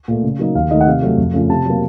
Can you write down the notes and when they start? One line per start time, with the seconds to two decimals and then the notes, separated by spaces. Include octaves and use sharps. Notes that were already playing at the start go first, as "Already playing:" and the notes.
0.08 A#2 A3
0.23 C#3
0.39 F#3 A#3 D#4
0.55 D#2 F5
0.71 D#3 A3 D#4 D#5
0.81 F#5
0.87 C3 F5
1.02 F#3 A3
1.18 F2
1.34 C#3 A3 C#4 F4
1.49 C3 A5
1.65 F#3 A#3